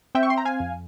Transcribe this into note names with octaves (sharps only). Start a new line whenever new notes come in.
C4 E5 G5
C#6
C6
A#5
F5 G#5
F2